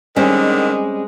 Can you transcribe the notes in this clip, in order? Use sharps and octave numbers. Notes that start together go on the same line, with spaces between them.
D3 D#3 G3 G#3 C4 C#4